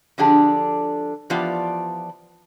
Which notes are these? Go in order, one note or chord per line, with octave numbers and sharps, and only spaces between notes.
D3 F3 D4 G4 G#4
E3 F3 B3 F4 G4 D5